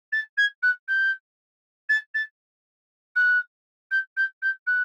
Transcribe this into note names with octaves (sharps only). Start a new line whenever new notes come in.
A6
G#6
F#6
G6
A6
A6
F#6
G6
G6
G6
F#6